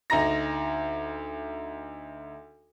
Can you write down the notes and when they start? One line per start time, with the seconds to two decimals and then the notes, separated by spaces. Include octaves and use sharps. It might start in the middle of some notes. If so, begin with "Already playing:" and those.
0.10 D2 D#4 A#5 A#6